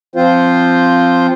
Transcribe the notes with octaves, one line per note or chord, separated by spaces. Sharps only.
F3 C4 F4 C5